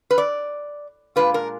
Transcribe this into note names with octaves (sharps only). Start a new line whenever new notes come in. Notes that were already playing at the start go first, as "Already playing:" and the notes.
B4
D5
A#2 G#3 D4 F4 B4
A#4